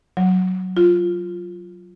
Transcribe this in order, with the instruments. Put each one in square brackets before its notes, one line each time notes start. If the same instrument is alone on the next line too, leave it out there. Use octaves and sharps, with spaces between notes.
[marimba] F#3
F4